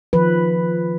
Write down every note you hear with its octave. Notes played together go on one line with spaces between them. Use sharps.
D#3 F3 B4